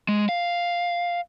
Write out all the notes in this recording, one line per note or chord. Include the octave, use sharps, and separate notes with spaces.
G#3
F5